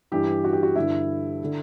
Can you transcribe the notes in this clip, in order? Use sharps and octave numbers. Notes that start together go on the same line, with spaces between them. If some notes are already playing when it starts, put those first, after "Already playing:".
G2 E3 G4
F#4
G4
F#4
G2 D3 E4
D3